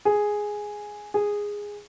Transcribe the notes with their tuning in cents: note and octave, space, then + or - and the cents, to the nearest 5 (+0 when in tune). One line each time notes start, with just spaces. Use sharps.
G#4 +0
G#4 -10